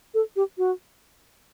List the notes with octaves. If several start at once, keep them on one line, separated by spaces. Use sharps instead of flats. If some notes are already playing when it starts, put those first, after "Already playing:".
A4
G4
F#4